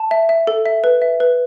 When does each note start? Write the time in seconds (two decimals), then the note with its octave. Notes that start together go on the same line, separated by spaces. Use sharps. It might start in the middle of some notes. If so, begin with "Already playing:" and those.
Already playing: A5
0.11 E5
0.29 E5
0.47 A4
0.66 E5
0.84 B4
1.02 E5
1.20 B4